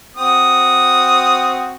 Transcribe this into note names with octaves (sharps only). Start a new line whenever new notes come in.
C4 F#4 D#6